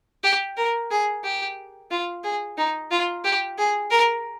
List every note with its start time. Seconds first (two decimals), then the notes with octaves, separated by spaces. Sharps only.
0.24 G4
0.57 A#4
0.91 G#4
1.24 G4
1.91 F4
2.24 G#4
2.57 D#4
2.91 F4
3.24 G4
3.58 G#4
3.91 A#4